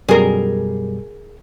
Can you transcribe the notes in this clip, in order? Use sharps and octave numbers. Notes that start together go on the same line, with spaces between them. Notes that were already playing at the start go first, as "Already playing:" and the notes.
F#2 B2 G3 G#4 A#4